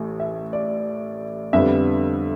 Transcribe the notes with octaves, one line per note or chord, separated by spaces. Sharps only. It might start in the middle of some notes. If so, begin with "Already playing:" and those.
Already playing: A1 A2
E5
D5
F2 D3 G3 B3 E5